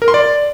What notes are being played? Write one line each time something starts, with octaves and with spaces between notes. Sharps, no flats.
A#4
C6
D5